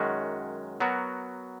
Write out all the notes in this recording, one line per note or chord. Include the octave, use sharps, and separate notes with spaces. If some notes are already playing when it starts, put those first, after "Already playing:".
Already playing: F#2 D#3 G#3 C#4 F#4
F#3 B3 F#4 A#4